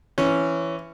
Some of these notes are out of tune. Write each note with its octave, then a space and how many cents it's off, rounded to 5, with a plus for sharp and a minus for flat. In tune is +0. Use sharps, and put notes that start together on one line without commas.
E3 +15 C#4 +0